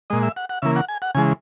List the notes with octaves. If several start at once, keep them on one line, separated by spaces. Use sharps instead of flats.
A#2 G#3 D#5
E5
F#5
F#5
C#3 E3 A#3 E5
F#5
G#5
F#5
C#3 E3 G#3 G#5